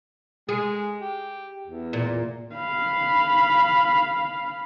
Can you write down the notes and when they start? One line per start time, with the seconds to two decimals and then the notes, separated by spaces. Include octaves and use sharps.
0.49 G#3 G#4
1.01 G4
1.67 E2
1.93 A#2
2.56 F5 B5